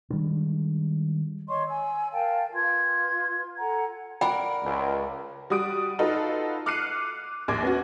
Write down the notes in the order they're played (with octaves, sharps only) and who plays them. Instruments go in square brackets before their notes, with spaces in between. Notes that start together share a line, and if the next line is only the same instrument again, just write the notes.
[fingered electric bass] D#3 G3 G#3 D4
[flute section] C#5 D#5 C6 C#6
G#5 E6
A#4 F5 G5 A5
F4 B4 C6 G#6
A4 F#5 G#5 A#5
[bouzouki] A#4 D5 F#5 [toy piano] G5 [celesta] B5
[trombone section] C#2
[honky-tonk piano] G3 F#4 D#6 D7
D#4 F4 F#4 A4 B4
D6 F6 F#6 C7 C#7 D#7
A#1 D#2 D6 G#6
B3 C#4 F#4